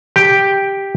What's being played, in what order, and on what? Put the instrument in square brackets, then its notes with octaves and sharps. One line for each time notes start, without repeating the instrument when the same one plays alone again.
[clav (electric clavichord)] G4 G5